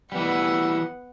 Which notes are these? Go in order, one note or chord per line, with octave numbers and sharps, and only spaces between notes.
E3 G3 B3 F#5